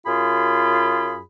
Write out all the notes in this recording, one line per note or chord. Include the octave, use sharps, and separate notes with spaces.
F#2 F4 G#4 B5